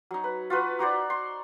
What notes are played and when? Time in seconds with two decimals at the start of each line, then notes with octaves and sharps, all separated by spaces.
0.11 F#3 D#4
0.24 B4
0.50 F4 F#4 B4
0.79 D#4 F#4 C5 D5
1.10 C6